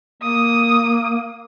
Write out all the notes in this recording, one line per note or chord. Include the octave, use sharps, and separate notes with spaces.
A#3 D#6